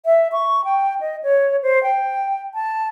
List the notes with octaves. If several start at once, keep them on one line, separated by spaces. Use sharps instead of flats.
E5
C#6
G5
D#5
C#5
C5
G5
A5